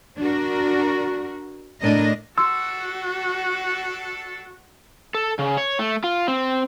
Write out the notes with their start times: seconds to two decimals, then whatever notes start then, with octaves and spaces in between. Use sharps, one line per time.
0.19 D4 F#4 A#4
1.81 A2 A3 D4 A#4 D#5
2.38 D4 F#4 A4 C6 E6
5.14 A4
5.39 C#3
5.57 C#5
5.79 A3
6.04 F4
6.28 C4